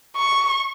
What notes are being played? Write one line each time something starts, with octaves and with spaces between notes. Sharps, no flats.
C#6